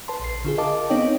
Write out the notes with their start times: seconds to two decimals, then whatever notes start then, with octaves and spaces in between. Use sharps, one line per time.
0.08 B4 A5 C6
0.20 A#1 C7
0.45 D3 F4 G#4
0.58 A#4 D#5 F5 A5 D6
0.90 B3 C4 D#4 C#5 D#5 G5